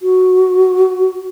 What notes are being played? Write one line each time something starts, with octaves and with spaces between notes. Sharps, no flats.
F#4